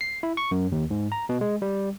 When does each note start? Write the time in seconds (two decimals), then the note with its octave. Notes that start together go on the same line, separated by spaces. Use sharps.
0.01 C7
0.23 E4
0.37 C#6
0.51 F#2
0.72 D#2
0.91 G#2
1.12 A#5
1.29 B2
1.41 G#3
1.62 G3